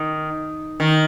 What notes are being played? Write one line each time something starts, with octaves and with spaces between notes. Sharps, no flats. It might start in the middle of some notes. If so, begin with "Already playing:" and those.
Already playing: D#3
D#3